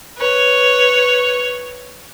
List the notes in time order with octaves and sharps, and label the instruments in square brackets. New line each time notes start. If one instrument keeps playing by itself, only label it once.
[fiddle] B4 C#5